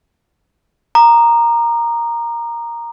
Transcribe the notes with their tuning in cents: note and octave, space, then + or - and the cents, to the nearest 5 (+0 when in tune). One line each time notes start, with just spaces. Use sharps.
A#5 +0 D#6 -45